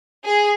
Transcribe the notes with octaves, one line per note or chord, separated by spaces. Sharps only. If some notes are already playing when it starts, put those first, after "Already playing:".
G#4